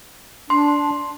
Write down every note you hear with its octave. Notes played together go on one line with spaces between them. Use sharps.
D4 C6